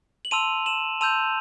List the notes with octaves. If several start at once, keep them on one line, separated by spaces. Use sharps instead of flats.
F#7
A5 C6 E6 D#7 F7
E7 F#7
A5 C6 E6 G6 D#7 F7